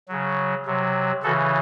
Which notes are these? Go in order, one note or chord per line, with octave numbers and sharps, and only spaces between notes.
C#3 F#3
C3 F#3
C#3 E3 F#4 A4